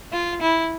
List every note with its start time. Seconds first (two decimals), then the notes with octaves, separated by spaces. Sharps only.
0.13 F4
0.41 E4